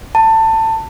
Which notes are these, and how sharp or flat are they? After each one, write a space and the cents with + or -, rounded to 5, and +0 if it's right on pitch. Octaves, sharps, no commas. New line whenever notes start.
A5 +20